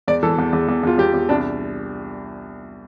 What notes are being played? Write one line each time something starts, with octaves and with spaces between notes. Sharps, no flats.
E2 D5
E3 A4
E2
E2
E2
E2 F4
E2 G4
E2
C2 D4